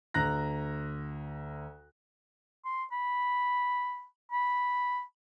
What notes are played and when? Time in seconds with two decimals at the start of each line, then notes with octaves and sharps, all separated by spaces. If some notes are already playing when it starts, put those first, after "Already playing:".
0.14 D2 A#5 F#6 A#6
2.65 C6
2.92 B5
4.32 B5